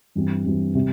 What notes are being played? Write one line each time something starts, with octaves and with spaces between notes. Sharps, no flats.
G2 E3 G3 C4
G2 E3 G3 C4
C3 G3